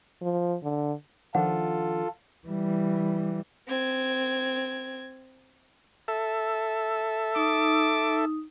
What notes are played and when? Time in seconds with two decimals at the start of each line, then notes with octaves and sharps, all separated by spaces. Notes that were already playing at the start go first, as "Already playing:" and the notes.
0.22 F3
0.63 D3
1.35 D#3 F3 D4 F4 A4 F#5
2.48 E3 G3
3.68 C4 G#6
6.08 A4 E5
7.36 D#4 D6 D#6